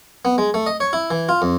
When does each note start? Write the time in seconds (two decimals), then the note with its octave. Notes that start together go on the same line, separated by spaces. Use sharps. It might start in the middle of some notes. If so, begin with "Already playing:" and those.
0.25 B3
0.38 G#3
0.54 A3
0.66 D#5
0.80 C#5
0.93 E4
1.11 E3
1.29 F4
1.42 F2